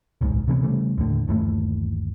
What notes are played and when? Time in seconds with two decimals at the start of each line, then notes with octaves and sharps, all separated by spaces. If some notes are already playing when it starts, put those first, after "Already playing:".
0.21 D1 B1 G#2
0.48 C3 E3 A#3 B3
0.62 C#3 E3 G3 A3
0.98 D#2 A2 D3
1.28 G1 D#2 E3 A3